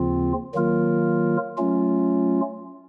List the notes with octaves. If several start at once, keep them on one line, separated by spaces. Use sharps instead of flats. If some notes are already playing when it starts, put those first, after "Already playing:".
Already playing: D#2 C#3 F3 C4 F4
D#3 F#3 A#3 F4 A#4
F#3 A3 C#4 F4